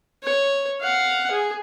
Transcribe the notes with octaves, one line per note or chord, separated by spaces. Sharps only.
C#5
F5 F#5
G#4